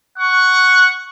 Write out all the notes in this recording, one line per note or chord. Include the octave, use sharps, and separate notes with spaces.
F#5 C#6